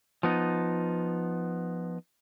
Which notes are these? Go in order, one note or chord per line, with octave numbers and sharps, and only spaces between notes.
F3 B3 D#4